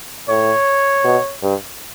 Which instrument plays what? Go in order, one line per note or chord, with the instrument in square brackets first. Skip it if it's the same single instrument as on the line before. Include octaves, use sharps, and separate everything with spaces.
[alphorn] A2 [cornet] C#5
[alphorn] B2
G2